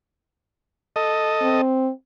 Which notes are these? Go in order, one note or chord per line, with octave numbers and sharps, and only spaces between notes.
A4 D#5
C4